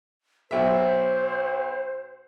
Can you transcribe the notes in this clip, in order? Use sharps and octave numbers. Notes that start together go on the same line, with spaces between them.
B1 C5 E5